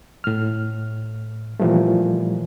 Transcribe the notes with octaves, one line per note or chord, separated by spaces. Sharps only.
A2 F6
A#2 E3 F3 G3 A3